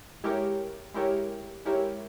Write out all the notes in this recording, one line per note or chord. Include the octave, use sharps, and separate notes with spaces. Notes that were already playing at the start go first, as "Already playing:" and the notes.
G#3 E4 G4 A#4 C#5
G#3 E4 G4 A#4 C#5
G#3 E4 G4 A#4 C#5